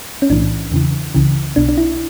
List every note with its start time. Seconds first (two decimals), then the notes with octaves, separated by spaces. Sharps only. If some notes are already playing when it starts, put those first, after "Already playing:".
0.22 C#4
0.30 B1 A2 E3 D4
0.72 E2 C#3 E3
1.14 C#2 C#3 E3
1.56 B1 B2 D4
1.69 D4
1.78 E4